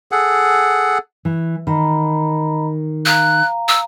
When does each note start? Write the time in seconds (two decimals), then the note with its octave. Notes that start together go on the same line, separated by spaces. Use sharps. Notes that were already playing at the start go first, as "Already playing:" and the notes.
0.12 G#4 A4 F#5
1.25 E3
1.67 D#3 D#5 A#5 B5
3.06 F5 A#5 F#6
3.68 E6